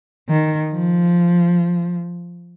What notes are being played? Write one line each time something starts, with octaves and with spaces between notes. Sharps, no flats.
D#3
F3